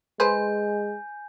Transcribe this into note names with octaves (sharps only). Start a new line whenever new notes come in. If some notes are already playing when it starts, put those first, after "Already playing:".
G#3 G#4 B4 C5 G#5 G6